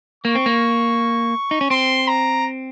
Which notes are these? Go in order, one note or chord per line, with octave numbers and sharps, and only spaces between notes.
A#3 C#6
C4
A#3
D#4
C#4
C4 C6
A#5